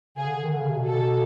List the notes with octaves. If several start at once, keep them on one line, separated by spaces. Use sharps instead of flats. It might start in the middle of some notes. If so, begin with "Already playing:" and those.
C#3 G#4
D3
D#3
D3
C#3
C3
B2
A4